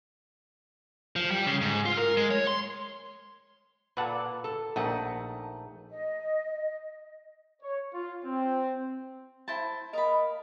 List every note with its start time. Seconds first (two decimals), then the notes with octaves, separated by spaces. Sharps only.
1.16 F3
1.31 G3
1.47 C#3
1.61 G#2
1.85 F4
1.97 A#4
2.17 G#3
2.31 C#5
2.47 C6
3.97 A#2 A4 B4 F#5 A5
4.44 A4
4.76 A#1 A3 D#4 F#5
5.90 D#5
7.62 C#5
7.93 F4
8.25 C4
9.48 E4 C5 A5
9.93 A#4 D#5 F5 B5